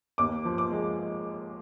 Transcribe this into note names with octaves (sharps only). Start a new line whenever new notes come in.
D#2 D6
F3
D6
G#3